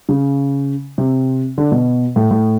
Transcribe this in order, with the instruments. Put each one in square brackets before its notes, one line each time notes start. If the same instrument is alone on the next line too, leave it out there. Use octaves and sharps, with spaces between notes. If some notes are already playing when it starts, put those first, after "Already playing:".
[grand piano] C#3
C3
D3
B2
A2
A2